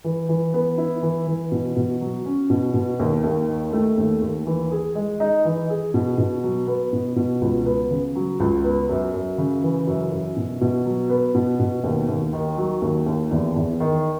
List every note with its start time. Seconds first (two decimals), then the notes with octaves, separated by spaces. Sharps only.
0.04 E3
0.29 E3
0.54 B3
0.78 E4
1.03 E3
1.27 E3
1.52 B2
1.76 B2
2.01 F#3
2.26 C#4
2.50 B2
2.74 B2
2.99 D#2
3.24 D#2
3.48 D#3
3.73 A3
3.98 D#2
4.22 D#2
4.47 E3
4.71 G#4
4.95 G#3
5.20 D#4
5.45 E3
5.70 G#4
5.94 B2
6.18 B2
6.43 F#3
6.67 B3
6.93 B2
7.16 B2
7.41 C#2
7.66 B3
7.91 C#3
8.15 F#3
8.40 C#2
8.64 B3
8.89 F#2
9.14 F#2
9.38 C#3
9.63 E3
9.87 F#2
10.12 F#2
10.37 B2
10.61 B2
10.86 F#3
11.10 B3
11.35 B2
11.60 B2
11.84 D#2
12.08 D#2
12.33 D#3
12.57 F#3
12.82 D#2
13.06 D#2
13.31 E2
13.56 E2
13.80 D#3